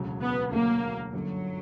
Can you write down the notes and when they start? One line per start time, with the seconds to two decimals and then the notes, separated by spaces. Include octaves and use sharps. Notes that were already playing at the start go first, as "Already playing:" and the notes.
Already playing: E1 D2 C#3 F#3
0.21 B3
0.52 E1 D2 C#3 F#3 A#3
1.13 G1 F#2 D3 F#3